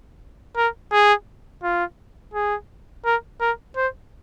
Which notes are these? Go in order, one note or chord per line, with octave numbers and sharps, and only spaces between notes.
A#4
G#4
F4
G#4
A#4
A#4
C5